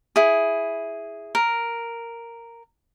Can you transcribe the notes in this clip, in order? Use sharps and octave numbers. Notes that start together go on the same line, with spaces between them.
E4 G#4
A#4